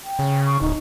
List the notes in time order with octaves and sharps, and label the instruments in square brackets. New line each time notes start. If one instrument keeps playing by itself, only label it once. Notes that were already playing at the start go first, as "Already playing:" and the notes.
[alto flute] G5
[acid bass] C#3
[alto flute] C#6
[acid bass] D1 [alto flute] D#4